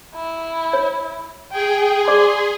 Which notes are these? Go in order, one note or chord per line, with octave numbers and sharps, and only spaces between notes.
E4
C#5
G#4 G5
D5 C6 D6